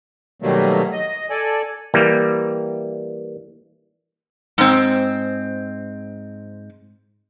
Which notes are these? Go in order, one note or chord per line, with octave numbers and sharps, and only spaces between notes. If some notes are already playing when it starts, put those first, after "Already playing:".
B2 D#3 F#3 G3 A3 A#3
D#5
A4 D5 G#5
E3 G3 A#3
G#2 C4